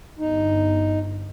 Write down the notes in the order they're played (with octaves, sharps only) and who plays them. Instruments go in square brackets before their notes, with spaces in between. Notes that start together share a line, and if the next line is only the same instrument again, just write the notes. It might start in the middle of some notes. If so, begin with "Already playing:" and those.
[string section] G1 [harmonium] D#4